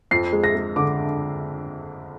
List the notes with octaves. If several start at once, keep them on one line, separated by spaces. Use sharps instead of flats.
F2 C7
G#3
A#6
G#3
D3 D6